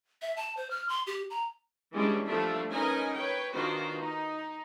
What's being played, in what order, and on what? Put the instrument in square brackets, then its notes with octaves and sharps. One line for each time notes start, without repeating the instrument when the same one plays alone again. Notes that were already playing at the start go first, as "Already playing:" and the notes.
[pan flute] E5
A5
C5
F6
C6
G4
A#5
[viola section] E3 G3 G#3 C#4 D4
F3 G3 A3 D4 F4 E5
C#4 D#4 A#4 B4 D#5 G#5
B4 C#5 G5
D#3 D4 F4 F#4 B4 C5
D#4